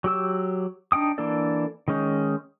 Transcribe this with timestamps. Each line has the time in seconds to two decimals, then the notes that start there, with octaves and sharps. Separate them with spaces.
0.04 F#3 G4 E6
0.92 D4 D#4 G5 D#6
1.18 E3 A#3 D4 A4 D5
1.88 D#3 G#3 C#4 D#4